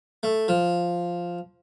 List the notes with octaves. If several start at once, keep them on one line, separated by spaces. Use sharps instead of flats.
A3
F3